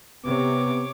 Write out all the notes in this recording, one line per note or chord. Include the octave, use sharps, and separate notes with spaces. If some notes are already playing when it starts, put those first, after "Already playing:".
C3 B3 C#5 D6